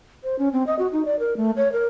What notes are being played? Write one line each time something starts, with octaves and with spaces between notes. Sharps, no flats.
C5
C#4
C4
D#5
F#4
D#4
D5
A#4
A3
C#5
A#4